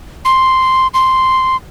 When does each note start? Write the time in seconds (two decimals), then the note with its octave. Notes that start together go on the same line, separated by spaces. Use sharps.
0.25 C6
0.94 C6